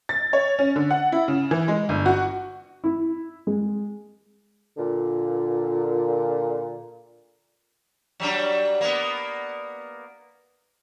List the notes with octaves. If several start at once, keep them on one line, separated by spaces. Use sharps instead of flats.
A6
C#5
C#4
D3
F#5
E4
C#3
E3
G#3
G1
F#4
E4
G#3
A#2 D3
F#3 G3 D4
A#3 B3